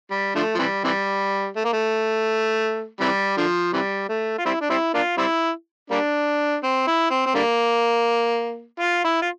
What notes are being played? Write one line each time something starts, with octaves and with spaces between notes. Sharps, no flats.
G3
D3 F3 A3
F3
C3 E3 G3
C3 E3 G3
A3
A#3
A3
C3 E3 G3
D3 F3
C3 E3 G3
A3
F4
G3 C4 E4
D4
G3 C4 E4
A#3 D4 F4
G3 C4 E4
G3 A#3 D4
C4
E4
C4
C4
D3 G3 A#3
F4
E4
F4